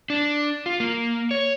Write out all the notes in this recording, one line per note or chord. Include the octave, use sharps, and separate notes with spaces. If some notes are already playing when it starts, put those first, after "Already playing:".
D4
F4
A#3
C#5